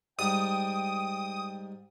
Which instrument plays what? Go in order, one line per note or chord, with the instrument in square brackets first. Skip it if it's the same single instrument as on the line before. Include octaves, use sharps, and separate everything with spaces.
[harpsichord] G#2 G3 [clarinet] G5 [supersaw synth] D#6